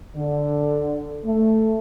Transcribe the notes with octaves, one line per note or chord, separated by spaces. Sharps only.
D3
A3